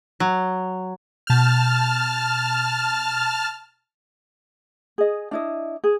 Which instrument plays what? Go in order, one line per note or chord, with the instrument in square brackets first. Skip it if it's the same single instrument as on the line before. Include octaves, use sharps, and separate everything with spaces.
[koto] F#3
[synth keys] B2 G6 [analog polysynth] A5 F6
[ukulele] G#4 D#5
D4 E4 D#5
G#4